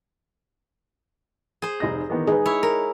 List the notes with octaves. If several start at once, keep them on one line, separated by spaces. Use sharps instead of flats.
G#4 C5
F1 D#4 A#6
D#3 E3 B3
D#4 G#4 B4
E4 C#5
A#4